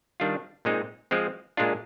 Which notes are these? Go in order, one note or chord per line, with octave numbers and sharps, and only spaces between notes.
D#3 G3 D4 F4
A#2 G#3 C4 D#4
F3 G#3 C4
A#2 G#3 D4 F4